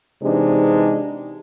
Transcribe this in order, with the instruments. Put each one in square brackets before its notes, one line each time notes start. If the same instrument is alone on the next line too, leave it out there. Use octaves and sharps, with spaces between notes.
[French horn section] C3 E3 G#3 D4 D#4